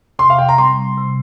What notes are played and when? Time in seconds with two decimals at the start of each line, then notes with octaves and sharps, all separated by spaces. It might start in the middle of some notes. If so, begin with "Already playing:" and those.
0.19 C3 C6
0.30 F5
0.39 G5
0.49 A#5
0.58 G3 C4 C6
0.97 C3